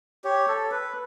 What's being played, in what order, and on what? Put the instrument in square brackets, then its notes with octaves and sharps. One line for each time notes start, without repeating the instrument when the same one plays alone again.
[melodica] G4 [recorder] C#5
[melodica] A4
B4